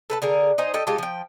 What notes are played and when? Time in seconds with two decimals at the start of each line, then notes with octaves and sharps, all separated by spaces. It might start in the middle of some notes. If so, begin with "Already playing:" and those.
0.10 A4 B4 A5
0.22 D3 G#4 A#4
0.58 D#4 C5 G#5
0.74 G4 A4 D#5
0.87 G#3 F4 G4 A4
0.98 F3 G5